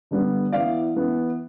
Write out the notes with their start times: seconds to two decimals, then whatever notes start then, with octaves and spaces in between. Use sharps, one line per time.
0.11 D3 G3 B3
0.52 E3 B3 E4 D5 F5
0.94 E3 B3 E4